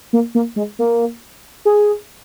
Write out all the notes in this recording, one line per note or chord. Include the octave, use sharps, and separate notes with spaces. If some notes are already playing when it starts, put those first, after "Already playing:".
A#3
A#3
G#3
A#3
G#4